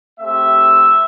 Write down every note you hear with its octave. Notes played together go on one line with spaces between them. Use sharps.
A3 C4 G4 E5